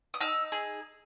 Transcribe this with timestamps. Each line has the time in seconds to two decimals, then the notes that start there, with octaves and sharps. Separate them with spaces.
0.14 D#6
0.20 D#4 E6
0.52 G#4